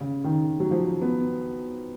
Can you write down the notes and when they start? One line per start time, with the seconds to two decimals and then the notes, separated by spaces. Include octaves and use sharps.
0.01 C#3
0.24 D#3
0.60 F#3
0.71 F3
1.02 B3